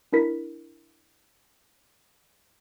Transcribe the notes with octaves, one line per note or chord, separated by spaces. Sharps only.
D4 E4 A#4 B6